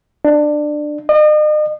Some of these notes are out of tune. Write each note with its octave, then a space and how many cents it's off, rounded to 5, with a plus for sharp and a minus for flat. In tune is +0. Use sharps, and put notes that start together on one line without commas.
D4 +20
D#5 -40